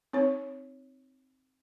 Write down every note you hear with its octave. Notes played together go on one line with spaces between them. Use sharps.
C4 D#4 C#5